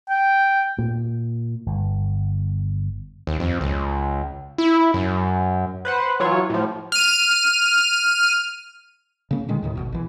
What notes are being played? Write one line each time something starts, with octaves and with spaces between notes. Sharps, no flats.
G5
A#2
G1
D#2
F2
C#2
E4
F#2
B4 C5 F#5
E3 F#3 F4 C#5
A2 F3
F6 D#7
C#3 A#3 C#4
A#2 D3 D#3 G#3
D#2 A2 D#3
G#1 C#2 B2
A#1 E3